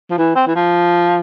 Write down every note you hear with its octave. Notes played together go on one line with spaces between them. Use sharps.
F3
E3
C4
E3
F3